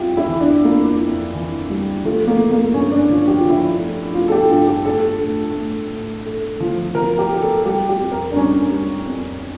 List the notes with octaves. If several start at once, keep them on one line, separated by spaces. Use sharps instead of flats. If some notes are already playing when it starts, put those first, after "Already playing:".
Already playing: F2 G3 E4 F4 G4
E4
E3
D4
F2 A#3
F2
E3
G3
F3 A3
A#3
A3
A#3
G2 C#4
D4
F3
G4
F4
F3
E4
F4
A3
A3 F4
A4
G4
G2 F4
G4
A3 A4
A2
A2
A2
A3
F3
F3 A#4
G4
A3 G4
A4
G3 G4
G4
F2
A#4
D4
G3 C#4
G3
F2